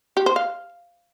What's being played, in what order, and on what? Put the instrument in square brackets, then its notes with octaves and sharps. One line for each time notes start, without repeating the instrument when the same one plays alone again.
[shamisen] G4
C5
F5